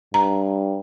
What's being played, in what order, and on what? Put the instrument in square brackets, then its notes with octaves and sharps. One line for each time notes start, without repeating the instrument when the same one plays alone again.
[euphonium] G2 [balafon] A#5